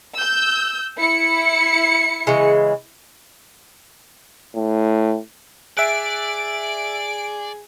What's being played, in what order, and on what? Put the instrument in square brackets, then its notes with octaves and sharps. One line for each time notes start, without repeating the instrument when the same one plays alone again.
[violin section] E6 G6
E4 C#7
[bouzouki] C#3 E3 G#3
[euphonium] A2
[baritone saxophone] G#4 [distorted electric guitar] D5 [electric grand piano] E5 F#6 [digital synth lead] D7